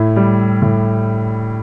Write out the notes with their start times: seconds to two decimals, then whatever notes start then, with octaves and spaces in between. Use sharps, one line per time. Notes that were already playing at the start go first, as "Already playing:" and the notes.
Already playing: A2 E4
0.16 G3
0.62 A2